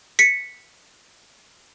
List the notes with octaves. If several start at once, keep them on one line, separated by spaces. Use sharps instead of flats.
B6 C#7